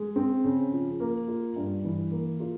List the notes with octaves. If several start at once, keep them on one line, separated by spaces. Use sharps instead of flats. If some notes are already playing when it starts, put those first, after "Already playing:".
Already playing: G#3
C4
C#3
F3
A#3
F4
G2
E3
A#3
F4